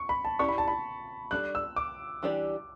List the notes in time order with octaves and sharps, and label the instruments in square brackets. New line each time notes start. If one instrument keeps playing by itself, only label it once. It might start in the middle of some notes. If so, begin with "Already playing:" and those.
Already playing: [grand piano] C#6
B5
A5
[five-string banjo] C#4 E4 G4 D5 [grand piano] C#6
[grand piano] B5
A5
B5
[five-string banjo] G3 D4 A4 D5 [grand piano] F#6
[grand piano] E6
D6
[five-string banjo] E3 G3 D4 G4 D5